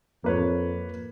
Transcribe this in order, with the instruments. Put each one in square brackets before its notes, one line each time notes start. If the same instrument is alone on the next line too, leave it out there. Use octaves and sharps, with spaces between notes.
[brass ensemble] F2 [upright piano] A#3 B4 C#5